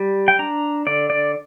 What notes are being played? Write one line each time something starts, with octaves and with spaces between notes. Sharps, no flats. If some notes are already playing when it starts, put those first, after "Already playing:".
Already playing: G3
G5
D4 A#5
D3 D5
D5